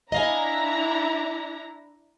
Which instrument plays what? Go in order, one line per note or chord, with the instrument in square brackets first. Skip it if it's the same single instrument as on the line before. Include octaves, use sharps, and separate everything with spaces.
[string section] D4 E4 A#5 [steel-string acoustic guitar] D#5 F5 G#5